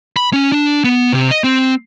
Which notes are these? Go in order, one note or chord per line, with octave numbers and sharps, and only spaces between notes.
B5
C#4
D4
B3
C3
D#5
C4